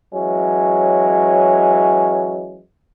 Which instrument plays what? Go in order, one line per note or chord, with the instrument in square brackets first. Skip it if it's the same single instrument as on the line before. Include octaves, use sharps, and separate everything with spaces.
[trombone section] E3 F#3 G#3 C#4